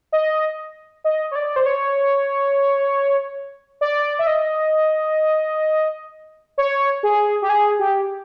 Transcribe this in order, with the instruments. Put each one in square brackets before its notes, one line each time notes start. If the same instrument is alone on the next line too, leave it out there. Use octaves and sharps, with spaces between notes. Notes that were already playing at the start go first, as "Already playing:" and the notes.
[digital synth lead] D#5
D#5
C#5
D5
C5
C#5
D5
E5
D#5
C#5
G#4
G4
G#4
G4